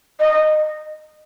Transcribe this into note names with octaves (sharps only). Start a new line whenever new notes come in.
D#5